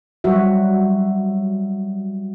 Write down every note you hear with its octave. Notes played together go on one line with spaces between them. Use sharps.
F#3 G3 F#4 E5